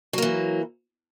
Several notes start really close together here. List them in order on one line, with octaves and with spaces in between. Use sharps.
F#3 A#3 E3